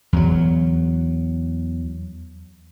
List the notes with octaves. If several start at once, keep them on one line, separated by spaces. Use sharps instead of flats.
E2 F#3